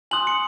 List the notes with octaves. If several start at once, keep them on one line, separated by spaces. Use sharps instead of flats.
G#5 C6 D#6 F#6 F#7
C#7